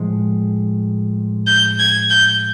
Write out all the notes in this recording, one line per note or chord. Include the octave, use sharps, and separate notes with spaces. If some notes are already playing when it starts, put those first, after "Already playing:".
Already playing: A2 F3 G#3
G6
G#6
G6